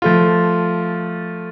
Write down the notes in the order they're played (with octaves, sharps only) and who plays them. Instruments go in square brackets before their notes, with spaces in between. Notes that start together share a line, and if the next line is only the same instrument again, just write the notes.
[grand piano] F3 A3 F4